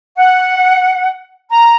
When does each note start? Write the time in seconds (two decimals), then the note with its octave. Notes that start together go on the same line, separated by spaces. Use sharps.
0.17 F#5
1.50 A#5